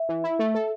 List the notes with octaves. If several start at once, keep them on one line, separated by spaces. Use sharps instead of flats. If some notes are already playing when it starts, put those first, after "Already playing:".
Already playing: E5
E3
E4
A3
A4